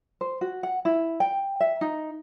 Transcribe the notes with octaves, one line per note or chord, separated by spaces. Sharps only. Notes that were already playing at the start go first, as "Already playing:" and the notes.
C5
F#4
F#5
E4
G5
E5
D#4